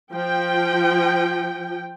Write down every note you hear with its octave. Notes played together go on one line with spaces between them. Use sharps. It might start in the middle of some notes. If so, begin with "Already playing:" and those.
F3 G5